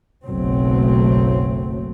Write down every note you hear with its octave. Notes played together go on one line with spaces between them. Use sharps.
F#1 B1 F#3 A3 C4